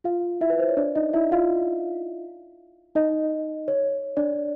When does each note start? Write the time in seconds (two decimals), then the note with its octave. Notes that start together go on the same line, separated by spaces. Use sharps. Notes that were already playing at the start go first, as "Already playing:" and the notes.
0.04 F4 F5
0.41 E4 E5
0.50 B4
0.59 C5
0.69 C#5
0.77 D4 D5
0.95 D#4 D#5
1.13 E4 E5
1.31 F4 F5
2.95 D#4 D#5
3.68 C#5
4.17 D4 D5